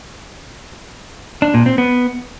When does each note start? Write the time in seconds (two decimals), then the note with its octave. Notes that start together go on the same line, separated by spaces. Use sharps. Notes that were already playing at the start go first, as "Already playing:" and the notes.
1.42 D4
1.54 A#2
1.66 C4
1.78 B3